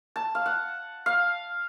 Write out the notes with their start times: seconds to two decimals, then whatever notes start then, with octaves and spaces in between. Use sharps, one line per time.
0.16 A5
0.35 F5
0.46 F#5
1.06 F5